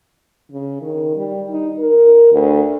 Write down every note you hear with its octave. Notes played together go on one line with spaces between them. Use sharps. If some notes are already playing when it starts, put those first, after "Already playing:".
C#3
D#3
G3
D#4
A#4
D2